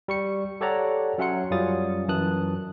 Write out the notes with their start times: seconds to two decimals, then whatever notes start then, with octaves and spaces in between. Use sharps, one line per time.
0.08 G3 C#6 C#7
0.61 G4 A4 C#5 D5 F#5 A#5
1.18 F#3 C#4 E5 F#5 C6 C#7
1.51 F#2 G3 C#4 F4 D#6 A6
2.08 F#2 E3 A5 D#6 F#6